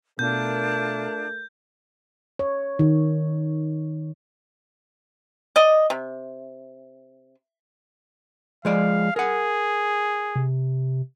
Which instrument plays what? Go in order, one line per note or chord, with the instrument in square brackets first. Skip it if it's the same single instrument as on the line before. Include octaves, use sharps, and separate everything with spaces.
[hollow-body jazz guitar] B2 [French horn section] A3 A#4 [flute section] D4 F4 A5 [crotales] G6
[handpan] C#5
D#3
[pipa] D5 D#5
C3
[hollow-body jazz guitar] F3 G#3 D5 [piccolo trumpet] F5
[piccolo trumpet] G#4 [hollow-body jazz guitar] A#4 F#5
[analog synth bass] C3